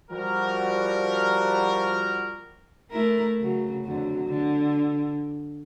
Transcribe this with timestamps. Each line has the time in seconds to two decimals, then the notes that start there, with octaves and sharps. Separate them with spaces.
0.11 F3 G3 F#4 A#4
2.91 A3 E4 A#4
3.39 C#3 F#3
3.84 F2 D3 F#3
4.25 D3